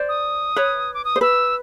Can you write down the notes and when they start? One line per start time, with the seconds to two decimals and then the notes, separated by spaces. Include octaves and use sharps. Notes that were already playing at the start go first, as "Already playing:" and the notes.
Already playing: C5 D5
0.09 D#6
0.56 B4 C#5
0.94 D6
1.05 D#6
1.16 C5
1.21 B4 E6